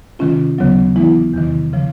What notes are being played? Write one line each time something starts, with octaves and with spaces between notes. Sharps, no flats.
C3 D#3 G#3 C#4 F4
D#2 C#3 F#3 B3
E3 G#3 B3 E4
E2 C3 D#3
C#3 F3